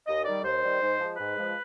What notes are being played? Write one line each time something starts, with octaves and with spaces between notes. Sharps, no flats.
D#2 D#5
D#3 G3 D5
D#2 C5
D#3 G3
G#2
F3 G#3
G#2 B4
F3 G#3